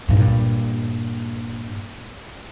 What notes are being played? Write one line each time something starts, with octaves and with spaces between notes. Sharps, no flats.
G2 A#2